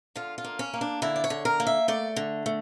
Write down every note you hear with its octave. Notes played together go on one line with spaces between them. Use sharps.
D3 F4
F4
A#3
C#4
A#3
D4
D3 E4
D5
C#5
D3
A#4
A#3
E5
A3 D5
D3
A3